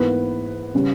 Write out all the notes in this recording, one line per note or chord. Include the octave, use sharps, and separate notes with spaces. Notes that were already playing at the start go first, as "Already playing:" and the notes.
Already playing: G#2 E3 A#3 B3 B4
C#3 G3 C#4